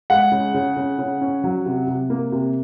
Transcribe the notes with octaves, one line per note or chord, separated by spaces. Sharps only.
G#3 F#5
C#3
C#3
C#3
C#3
C#4
F#3
C3
C3
A#3
C3